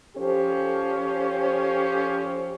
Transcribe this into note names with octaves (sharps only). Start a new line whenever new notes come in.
F3 C#4 G4 A4 C5